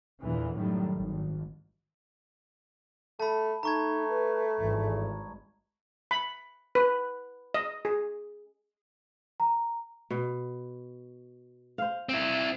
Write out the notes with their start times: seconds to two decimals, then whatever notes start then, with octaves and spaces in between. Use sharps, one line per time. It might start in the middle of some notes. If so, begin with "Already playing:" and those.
0.19 E2 A#2 D3 E3
0.54 F#2 A2 D#3 F#3 G3
0.94 G#1
3.20 A3 A5 B5
3.63 A3 D#4 A#5 C#6 G#6
4.09 B4
4.59 G#1 G2 E3 G#3
6.11 B5
6.75 B4
7.54 D#5
7.85 G#4
9.40 A#5
10.10 B2
11.78 C5 F5
12.09 C4 E4